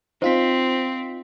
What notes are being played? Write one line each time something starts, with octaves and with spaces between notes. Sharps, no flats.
C4 D#4 F4 C5 B6